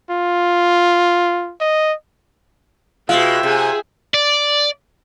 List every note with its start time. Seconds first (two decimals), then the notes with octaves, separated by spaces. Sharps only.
0.10 F4
1.61 D#5
3.09 B2 G#3 F4 E5 G5
3.43 C3 G#4
4.14 D5